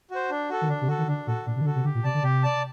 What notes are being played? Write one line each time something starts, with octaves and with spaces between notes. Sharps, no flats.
F#4 C5
D4
F#4 A4
D#3
D3 D4
C3
D3 F#4 A4
D#3
D3 D4
A#2 F#4 A4
A#2 D4
C3
D#3
D3 F#4 A4
C3
D3 G4
A#2
C3 D5 A5
D3
C3 G4
D5 A5